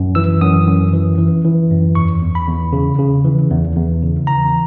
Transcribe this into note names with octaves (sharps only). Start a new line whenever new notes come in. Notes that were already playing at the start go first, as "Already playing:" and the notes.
Already playing: F#2
E3 E6
F#2 D#6
F#2
E3
E3
E3
F#2
E2 C#6
E2
B5
E2
C#3
C#3
E3
E2
E2
C#3
E3 A#5